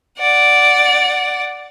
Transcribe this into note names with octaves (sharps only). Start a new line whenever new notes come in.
D5 F#5